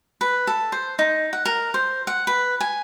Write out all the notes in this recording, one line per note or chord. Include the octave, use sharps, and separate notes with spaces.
B4
A4
C5
D#4
F#5
A#4
C5
F#5
B4
G#5